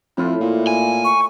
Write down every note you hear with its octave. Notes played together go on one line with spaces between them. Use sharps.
F2 A2 E4 F4
A#2
G#5
C#6